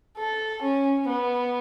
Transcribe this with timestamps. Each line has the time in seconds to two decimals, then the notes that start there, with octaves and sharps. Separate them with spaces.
0.18 A4
0.62 C#4
1.08 B3